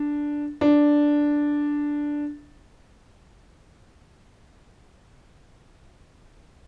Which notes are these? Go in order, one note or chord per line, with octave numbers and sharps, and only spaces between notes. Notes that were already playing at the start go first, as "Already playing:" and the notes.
Already playing: D4
D4